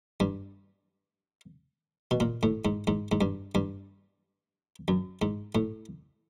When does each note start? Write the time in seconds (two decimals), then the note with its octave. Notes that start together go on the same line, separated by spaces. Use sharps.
0.20 G2
2.11 B2
2.20 A#2
2.43 A2
2.65 G#2
2.87 G#2
3.12 G#2
3.21 G2
3.55 G2
4.88 F#2
5.22 G#2
5.55 A2